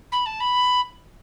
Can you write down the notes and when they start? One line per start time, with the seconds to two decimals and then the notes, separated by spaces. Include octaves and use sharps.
0.12 B5
0.26 A5
0.40 B5